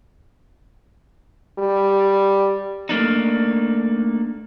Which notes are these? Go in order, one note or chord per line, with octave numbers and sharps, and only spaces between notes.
G3
A3 A#3 D4 D#4